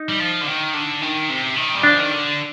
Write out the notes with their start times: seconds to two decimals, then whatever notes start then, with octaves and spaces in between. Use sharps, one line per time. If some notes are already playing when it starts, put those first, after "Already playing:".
Already playing: D#4
0.09 G3
0.20 F3
0.41 D3
0.47 D#3
0.74 D3
1.02 D#3
1.29 C3
1.56 D#3
1.75 G3
1.83 F3 D4
1.98 D#3
2.11 D3